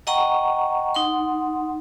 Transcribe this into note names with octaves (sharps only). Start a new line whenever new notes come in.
D#5 F#5 G5 A#5 C#6
D#4 F#5 C6